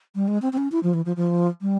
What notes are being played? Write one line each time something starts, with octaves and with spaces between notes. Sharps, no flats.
G3
G#3
C4
C4
C#4
E4
F3
E3
F3
F3
G3